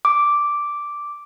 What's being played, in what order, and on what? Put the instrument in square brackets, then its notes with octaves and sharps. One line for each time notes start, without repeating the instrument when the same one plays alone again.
[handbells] D6